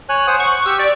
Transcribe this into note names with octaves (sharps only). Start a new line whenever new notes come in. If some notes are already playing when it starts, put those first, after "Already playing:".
C#5 G#5 F#6
C5 F#5 D#6
F#5 C#6
G4 E6
D5